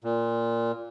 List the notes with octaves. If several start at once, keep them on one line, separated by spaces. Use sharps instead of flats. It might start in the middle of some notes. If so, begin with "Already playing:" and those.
A#2